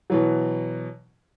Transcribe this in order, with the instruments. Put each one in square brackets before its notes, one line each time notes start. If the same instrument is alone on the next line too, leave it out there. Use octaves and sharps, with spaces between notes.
[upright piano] B2 E3 F#3